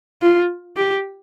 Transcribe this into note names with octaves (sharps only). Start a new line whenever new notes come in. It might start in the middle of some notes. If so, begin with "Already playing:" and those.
F4
G4